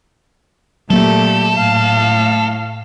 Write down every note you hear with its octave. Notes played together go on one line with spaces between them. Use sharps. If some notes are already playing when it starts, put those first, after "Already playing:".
A#2 F#3 A3 A#3 G4 A4
A2 F5